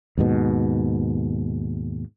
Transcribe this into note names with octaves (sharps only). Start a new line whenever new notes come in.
D#2 G#2 B2